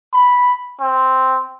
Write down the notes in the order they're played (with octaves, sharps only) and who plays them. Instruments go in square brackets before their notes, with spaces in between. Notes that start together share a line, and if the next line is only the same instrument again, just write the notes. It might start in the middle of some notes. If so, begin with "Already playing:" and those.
[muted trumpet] B5
C4